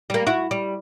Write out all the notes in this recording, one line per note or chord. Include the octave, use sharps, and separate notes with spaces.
G3 A#3
E4 F#4
G3